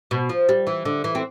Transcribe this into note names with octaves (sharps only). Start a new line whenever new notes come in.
B2
F3
G3
E3
D3
E3
C4